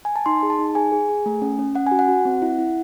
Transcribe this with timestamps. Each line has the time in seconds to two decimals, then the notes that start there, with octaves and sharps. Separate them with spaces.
0.05 G#5
0.16 A5
0.26 D#4 C6
0.43 G#4
0.50 A5
0.59 D#4
0.75 G#4 G#5
0.92 G#4
1.09 G#4
1.26 A3
1.42 C#4
1.59 C#4
1.75 C#4 F#5
1.87 F#4 G#5
1.99 F#5
2.08 F#4
2.25 C4
2.42 E4
2.59 E4